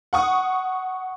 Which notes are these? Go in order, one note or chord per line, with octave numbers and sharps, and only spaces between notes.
F#5 C#6 D#6